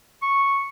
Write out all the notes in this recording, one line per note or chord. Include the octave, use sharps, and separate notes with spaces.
C#6